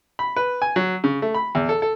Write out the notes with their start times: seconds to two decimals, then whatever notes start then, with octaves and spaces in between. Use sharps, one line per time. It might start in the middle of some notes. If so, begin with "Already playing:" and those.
0.19 B5
0.36 B4
0.62 G#5
0.76 F#3
1.04 C#3
1.22 A3
1.34 B5
1.55 E2
1.69 A4
1.82 A4